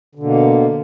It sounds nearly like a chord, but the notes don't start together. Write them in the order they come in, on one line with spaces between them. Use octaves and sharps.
D3 B2 A#3